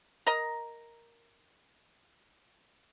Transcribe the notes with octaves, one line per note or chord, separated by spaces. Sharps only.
A#4 D#5 A#5